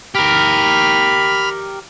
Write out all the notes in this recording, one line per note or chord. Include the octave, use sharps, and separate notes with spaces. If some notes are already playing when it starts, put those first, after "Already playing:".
G4 A#4 B5 F6